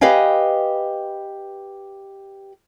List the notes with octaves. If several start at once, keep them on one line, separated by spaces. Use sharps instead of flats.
G4 B4 D#5 F5 G#5